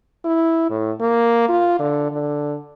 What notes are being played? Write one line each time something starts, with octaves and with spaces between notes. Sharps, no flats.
E4
A2
A#3
F4
D3
D3